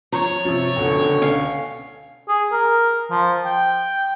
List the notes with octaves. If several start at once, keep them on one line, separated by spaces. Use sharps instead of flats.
F3 C#5 A#5
C3 F3
C#2 B2 D3
C#4 F5
G#4
A#4
F3
G5